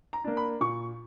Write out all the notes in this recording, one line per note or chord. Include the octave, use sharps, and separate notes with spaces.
A#5
A#3 D4
B5
A#2 C#6